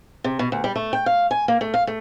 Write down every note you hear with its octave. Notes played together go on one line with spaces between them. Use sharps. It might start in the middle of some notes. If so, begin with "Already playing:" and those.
C3
B2
D2
G3
A3
G5
F5
G#5
A#3
A3
F5
A3